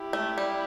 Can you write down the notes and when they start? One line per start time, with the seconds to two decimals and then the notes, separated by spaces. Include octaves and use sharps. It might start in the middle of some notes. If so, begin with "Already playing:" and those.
Already playing: E4 G4
0.13 A3
0.38 G3